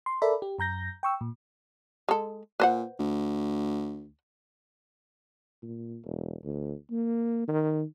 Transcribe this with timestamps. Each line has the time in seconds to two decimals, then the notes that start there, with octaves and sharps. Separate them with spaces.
0.06 C6
0.22 A4 A#4 D5 E5 B5
0.42 G4
0.59 F#2 A#5 G6 A#6
1.03 G5 C#6 E6
1.21 A#2
2.09 G#3 A4
2.60 A#2 B4 C5 F#5
2.99 D2
5.62 A#2
6.05 E1
6.44 D2
6.91 A#3
7.48 D#3